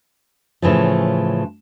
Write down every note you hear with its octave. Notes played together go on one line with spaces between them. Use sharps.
A2 C#3 E3 F3